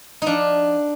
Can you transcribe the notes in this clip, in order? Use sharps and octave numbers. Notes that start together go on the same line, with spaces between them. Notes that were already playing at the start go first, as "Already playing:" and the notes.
F3 D4 D#4